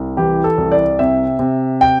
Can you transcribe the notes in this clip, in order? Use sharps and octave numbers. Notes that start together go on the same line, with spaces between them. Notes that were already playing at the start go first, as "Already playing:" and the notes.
Already playing: C2
E3 G4
A4
C2
D5
C3 E5
C3
G5